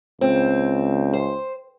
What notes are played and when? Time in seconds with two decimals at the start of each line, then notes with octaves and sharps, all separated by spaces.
0.21 C#2 C4
1.13 C5